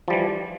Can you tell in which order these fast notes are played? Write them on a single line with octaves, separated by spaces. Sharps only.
F3 G3 E3